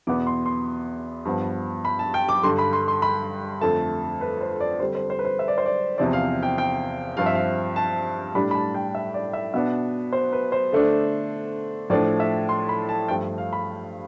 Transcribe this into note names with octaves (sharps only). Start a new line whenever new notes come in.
E2 B2 B3 D6
C6
C6
G2 F3 B3
B5
A5
G5
D6
G2 D3 G3 C6
B5
C6
C6
B5
F2 D3 A3 A5
B4
C5
D5
D3 G3 C4 C5
C5
C5
B4
C5
E5
D5
C5
D5
E2 C3 F3 C4 D5
F5
G5
G5
G2 F3 C4 F5
E5
F5
A5
A2 G3 D4 B5
B5
A5
G5
E5
D5
E5
B2 B3 D4 E5
C5
B4
C5
D3 A3 D4
A2 F3 A3 D4 D5
E5
C6
B5
A5
G2 F3 A3 G5
F5
B5